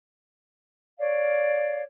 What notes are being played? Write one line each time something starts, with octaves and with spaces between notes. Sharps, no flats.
C#5 D5 F5